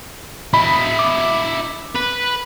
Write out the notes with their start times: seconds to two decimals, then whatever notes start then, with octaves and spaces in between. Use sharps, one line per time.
0.54 E4 D#5 B5
0.99 D6
1.95 B4